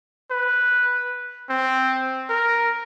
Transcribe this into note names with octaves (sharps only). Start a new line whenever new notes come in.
B4
C4
A#4